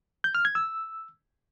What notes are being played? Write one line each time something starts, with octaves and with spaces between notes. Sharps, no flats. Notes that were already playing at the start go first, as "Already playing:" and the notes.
G6
F6
G#6
E6